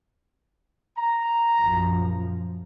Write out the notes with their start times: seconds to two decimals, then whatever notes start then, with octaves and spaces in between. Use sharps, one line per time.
0.97 A#5
1.58 A#1 F#2 F3